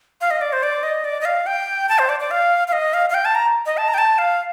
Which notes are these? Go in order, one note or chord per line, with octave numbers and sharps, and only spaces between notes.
F5
D#5
D5
C5
D5
D#5
D5
D#5
F5
G5
A5
C5
D5
D5
F5
F5
D#5
F5
F5
G5
A5
A#5
D#5
A5
A#5
G5
A5
F5